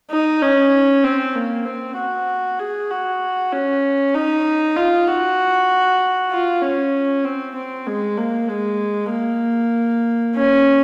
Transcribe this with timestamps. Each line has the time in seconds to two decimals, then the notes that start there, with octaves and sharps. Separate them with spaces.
0.11 D#4
0.42 C#4
1.04 C4
1.36 A#3
1.66 C4
1.97 F#4
2.59 G#4
2.90 F#4
3.52 C#4
4.15 D#4
4.76 F4
5.07 F#4
6.31 F4
6.62 C#4
7.25 C4
7.55 C4
7.87 G#3
8.17 A#3
8.49 G#3
9.10 A#3
10.35 C#4